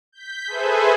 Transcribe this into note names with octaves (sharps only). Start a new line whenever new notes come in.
G6 B6
G#4 A4 B4 C5 E5 G#5